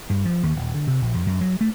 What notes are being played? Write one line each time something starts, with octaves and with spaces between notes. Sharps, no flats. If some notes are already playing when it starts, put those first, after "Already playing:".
G2
F3
D#2
D#1
D3
C3
A#1
F2
F#2
F#3
A3